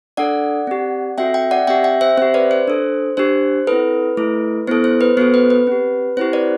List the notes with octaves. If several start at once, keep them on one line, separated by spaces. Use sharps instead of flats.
D4 A4 D5 F#5
C4 G4
C4 F#4 A4 E5 G5
E5 G5
D5 F#5
C4 G4 E5 G5
E5 G5
C5 E5
C4 G4 C5 E5
B4 D5
C5
D4 A4
D4 G4 C5
C4 E4 A4 B4
A3 E4 A4
B3 E4 A4 C5
C5
B4
B3 F#4 A4 C5
B4
B4
C4 G4
C4 E4 G4 C5
B4 D5